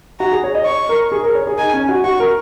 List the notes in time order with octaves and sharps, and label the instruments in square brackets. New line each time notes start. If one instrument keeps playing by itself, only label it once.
[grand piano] F#4 [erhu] A#5
[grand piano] G#4
C#5
D#5
[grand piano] C#5 [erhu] C#6
[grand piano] A#4
G#4
A#4
C#5
G#4
[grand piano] D#4 [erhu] G#5
[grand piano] C#4
F#4
[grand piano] F#4 [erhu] C#6
[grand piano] A#4